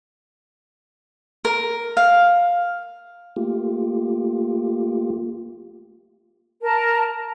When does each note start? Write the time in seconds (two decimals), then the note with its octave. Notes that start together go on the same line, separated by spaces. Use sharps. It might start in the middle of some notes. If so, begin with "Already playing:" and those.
1.45 A#4
1.97 F5
3.36 A3 A#3 F4 G4
6.62 A#4 A5